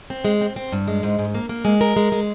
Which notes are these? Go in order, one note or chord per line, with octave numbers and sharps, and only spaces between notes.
C4
G#3
C4
C4
G2
G#3
G#2
G#2
A#3
A#3
G#3
A#4
G#3
G#3